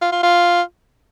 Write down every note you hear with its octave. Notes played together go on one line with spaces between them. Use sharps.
F4
F4
F4